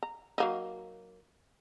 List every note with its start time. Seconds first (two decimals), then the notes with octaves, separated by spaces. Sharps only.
0.03 A#5
0.38 F#3 A#3 D#4